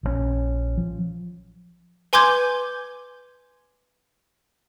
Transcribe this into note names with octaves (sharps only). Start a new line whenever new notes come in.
A#1 D3 C#4
F3
B4 G#5 C6 D6 G6 G#6